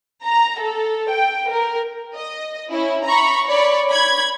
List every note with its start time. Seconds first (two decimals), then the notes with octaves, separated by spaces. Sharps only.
0.25 A#5
0.60 A4
1.11 G5
1.50 A#4
2.14 D#5
2.72 C#4 E4
3.05 A#5 B5 C#6
3.47 C#5 D5 B5 C#6
3.91 B5 G#6